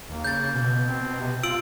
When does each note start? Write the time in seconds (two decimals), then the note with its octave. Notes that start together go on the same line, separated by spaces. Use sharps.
0.09 D#2 A#3
0.24 C#3 G6 A6
0.55 B2
0.87 C4
1.20 C3
1.43 C4 F4 E6 D7 F#7